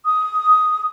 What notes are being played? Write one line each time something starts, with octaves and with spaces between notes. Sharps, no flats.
D#6